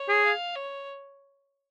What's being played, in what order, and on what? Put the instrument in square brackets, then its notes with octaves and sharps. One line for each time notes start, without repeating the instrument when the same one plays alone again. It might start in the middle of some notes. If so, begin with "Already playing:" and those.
Already playing: [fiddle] C#5
[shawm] G#4
[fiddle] F5
C#5